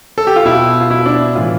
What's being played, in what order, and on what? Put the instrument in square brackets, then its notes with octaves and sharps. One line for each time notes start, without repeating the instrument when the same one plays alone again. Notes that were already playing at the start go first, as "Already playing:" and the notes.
[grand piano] A4
G4
F4
B2 E4
F4
B2 E4
D4
E4
A2 E3 F4